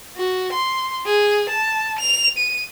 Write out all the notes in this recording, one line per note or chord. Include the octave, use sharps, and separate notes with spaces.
F#4
C6
G#4
A5
F7
D#7